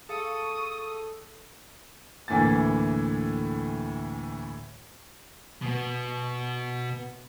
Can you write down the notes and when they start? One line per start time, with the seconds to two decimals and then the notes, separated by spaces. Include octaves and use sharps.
0.09 G#4 A4 F5 C#6 D#6 C#7
2.28 D2 A2 E3 A#3 G#5 A6
5.62 B2 B3